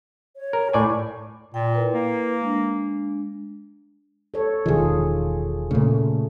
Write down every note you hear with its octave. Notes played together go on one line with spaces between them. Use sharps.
C#5
A#4
A2 D5 G#5 C#6
A#2 G5
E4 A#4 B4
A#3
G#3 D4
A4 C#5
E1 D#3 F4 G#4
A#2 C#3 A3